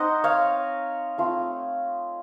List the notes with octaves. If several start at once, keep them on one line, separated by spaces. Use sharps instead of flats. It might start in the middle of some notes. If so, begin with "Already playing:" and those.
Already playing: C4 D#4 C5 D#5 F#5
C#5 F5
A3 C4 F4